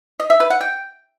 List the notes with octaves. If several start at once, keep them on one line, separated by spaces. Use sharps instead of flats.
D#5
E5
B4
F#5
G5